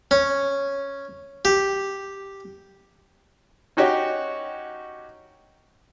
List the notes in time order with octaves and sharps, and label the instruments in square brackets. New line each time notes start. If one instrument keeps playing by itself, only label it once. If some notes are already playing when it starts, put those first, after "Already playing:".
[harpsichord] C#4
G4
[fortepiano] C#4 D#4 F#4 G4 C#5